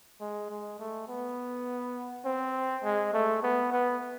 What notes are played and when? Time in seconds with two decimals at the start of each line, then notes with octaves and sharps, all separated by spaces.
0.21 G#3
0.51 G#3
0.79 A3
1.08 B3
2.25 C4
2.83 G#3
3.14 A3
3.43 B3
3.72 B3